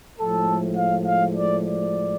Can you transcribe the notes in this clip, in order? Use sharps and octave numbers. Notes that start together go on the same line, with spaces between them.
A2 F3 G#3 A4
F5
F5
D5
D5